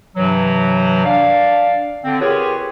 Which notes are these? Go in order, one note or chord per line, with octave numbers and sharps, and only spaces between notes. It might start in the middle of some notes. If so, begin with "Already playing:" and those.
G2 C3 E3 F#3
D4 D5 F5
D3 C4
F4 G4 G#4 A#4 B4 C#5